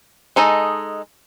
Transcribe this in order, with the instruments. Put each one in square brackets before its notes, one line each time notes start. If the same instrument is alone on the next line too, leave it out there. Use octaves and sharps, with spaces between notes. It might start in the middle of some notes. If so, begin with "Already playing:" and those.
[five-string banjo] G#3 D#4 A4 D#5